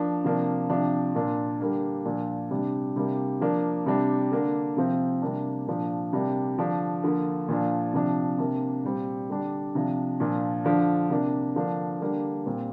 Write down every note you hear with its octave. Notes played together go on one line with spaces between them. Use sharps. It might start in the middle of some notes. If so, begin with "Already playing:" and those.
Already playing: F3 A#3 D4
C3 F3 A#3 D4
C3 F3 D4
A#2 A#3 D4
D3 G3 A#3 D4
A#2 F3 D4
C3 G3 D4
C3 G3 A#3 D4
F3 A#3 D4
C3 G3 D4
D3 A#3 D4
C3 F3 C4
C3 G3 A#3 D4
A#2 F3 D4
C3 G3 A#3 D4
D3 F3 D4
D3 F3 A#3
A#2 F3 D4
C3 F3 D4
C3 A#3 D4
A#2 G3 C4
D3 G3 D4
C3 F3 D4
A#2 F3 D4
D3 F3 D4
C3 A#3 D4
D3 F3 A#3 D4
D3 G3 A#3 D4
A#2 G3 C4